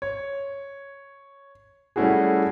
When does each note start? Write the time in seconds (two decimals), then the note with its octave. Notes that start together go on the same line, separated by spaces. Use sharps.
0.02 C#5
1.96 G3 A3 C#4 E4 F#4 G#4